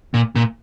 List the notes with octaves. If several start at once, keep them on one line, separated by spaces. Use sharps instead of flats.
A#2
A#2